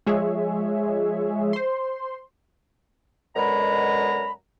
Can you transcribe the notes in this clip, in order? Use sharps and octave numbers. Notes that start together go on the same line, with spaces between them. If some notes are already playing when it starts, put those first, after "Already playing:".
F3 G#3 G#4 C#5 E5
C5 C6
F#2 B2 D3 G#3 A#5 B5